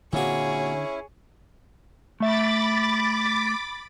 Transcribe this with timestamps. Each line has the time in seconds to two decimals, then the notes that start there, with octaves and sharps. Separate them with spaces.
0.13 A#2 D3 C4 C#4 E4 F#4 G#4 C#5
2.20 A3 E5 B5 D6 A6